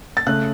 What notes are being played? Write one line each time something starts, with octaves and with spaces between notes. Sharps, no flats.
A6
C#3 A3 F#6